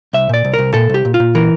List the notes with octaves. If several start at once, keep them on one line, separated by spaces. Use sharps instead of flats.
C2 E5
A#2 D5
C2
A#4
C2
A#2 A4
C2 G4
A#2
F4
A#2
E3 A#4